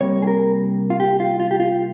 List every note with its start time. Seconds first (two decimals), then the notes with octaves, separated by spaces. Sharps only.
0.01 C2 C3 G3 A#3 C#5
0.22 G#4
0.27 A#4
0.90 F4
1.00 G4
1.20 F4
1.40 F4
1.51 G4
1.60 F4